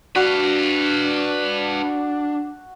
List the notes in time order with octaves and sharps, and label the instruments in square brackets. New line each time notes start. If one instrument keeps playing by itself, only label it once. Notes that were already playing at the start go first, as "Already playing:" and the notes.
[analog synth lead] D4 [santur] F#4 [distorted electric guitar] B4 F5